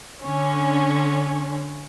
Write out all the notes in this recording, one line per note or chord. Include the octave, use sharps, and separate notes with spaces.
D3 C#4